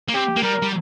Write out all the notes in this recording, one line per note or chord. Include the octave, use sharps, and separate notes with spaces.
A#3
C4 G4
A#3
G3 A#4
G3